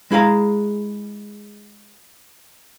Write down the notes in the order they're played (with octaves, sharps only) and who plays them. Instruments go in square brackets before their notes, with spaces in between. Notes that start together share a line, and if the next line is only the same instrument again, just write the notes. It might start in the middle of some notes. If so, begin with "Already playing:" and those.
[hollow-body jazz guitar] G#3 E4 G#4 F5 A#5